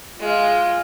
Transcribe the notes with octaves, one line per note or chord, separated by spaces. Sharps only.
G#3 F4